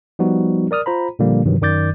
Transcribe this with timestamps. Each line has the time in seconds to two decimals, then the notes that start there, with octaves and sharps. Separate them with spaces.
0.19 F3 G3 B3 D#4 F#4
0.71 A#4 D5 D#6 F6
0.86 F4 C5 A#5 B5
1.19 A#2 D3 F3 G3 A#3
1.45 G2 C3 D#3 E3 F#3
1.61 F#2 D#3 D5 D6 G6 A6